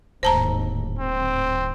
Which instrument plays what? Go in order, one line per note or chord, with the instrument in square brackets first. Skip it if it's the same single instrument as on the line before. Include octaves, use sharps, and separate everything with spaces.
[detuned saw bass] D1 [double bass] D#2 G#2 [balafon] C5 A5 A#5
[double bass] G#2 [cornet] C4